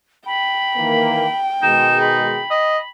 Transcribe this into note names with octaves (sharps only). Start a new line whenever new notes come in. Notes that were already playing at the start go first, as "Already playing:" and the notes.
G5 B5
D#3 E3 A#3
B2 D#3 G#3 D#4 E7
B5
D#5